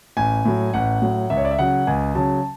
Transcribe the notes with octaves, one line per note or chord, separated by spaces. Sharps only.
A1 G#5
A2 F#3
A1 F#5
A2 F#3
C#2 E5
C#5
D5
E5
C#3 F#3 F#5
C#2 G#5
C#3 F#3 A5